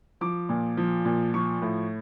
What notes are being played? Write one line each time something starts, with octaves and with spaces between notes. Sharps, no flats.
F3 D6
A#2
F3
A#2
F3 C#6
A2